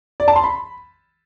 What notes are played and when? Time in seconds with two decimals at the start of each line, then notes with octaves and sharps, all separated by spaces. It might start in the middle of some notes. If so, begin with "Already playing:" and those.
0.20 D5
0.28 A5
0.36 C6
0.44 B5